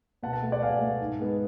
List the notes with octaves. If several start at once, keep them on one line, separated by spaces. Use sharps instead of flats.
B2 F#5 A5
F#5 A5
A3
D5 F#5
B2 F5 G#5
A3
G#2
G#3 B3